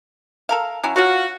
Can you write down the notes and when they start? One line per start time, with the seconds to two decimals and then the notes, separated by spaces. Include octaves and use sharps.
0.49 A4 A#4 F5
0.83 F#3 C#4 E4
0.96 F4 F#4 C#5 F5